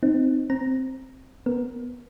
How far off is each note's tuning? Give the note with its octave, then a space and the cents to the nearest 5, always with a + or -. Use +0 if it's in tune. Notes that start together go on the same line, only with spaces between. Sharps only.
C4 +0 D#4 +0
C4 +0 A#5 +0
B3 +0 A#4 +0